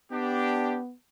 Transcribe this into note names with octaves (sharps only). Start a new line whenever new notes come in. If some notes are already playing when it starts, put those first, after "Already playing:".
B3 D4 G4